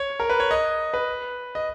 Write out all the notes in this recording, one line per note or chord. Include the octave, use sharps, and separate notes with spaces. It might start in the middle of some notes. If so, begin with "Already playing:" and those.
Already playing: C#5
A#4
B4
C#5
D#5
B4
D#5